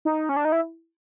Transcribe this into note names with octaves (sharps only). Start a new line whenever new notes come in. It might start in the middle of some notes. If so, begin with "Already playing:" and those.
D#4
C#4
D4
D#4
E4